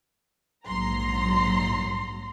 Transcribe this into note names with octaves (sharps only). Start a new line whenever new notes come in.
A#1 G#2 F#3 A#5 C6